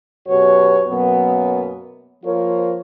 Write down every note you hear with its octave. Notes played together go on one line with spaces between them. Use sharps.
F#2 B2 F#4 G4 B4 C#5
F#2 B2 F#3 A#3 B3
F3 A#3 F4 A#4 C5 C#5